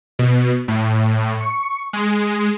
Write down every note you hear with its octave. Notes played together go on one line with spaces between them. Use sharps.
B2
A2
C#6
G#3